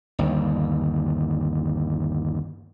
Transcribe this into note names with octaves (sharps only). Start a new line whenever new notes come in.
G1 D#2